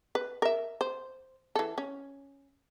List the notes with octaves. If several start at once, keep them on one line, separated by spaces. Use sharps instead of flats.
B4
A#4 E5
C5
E3 A4
C#4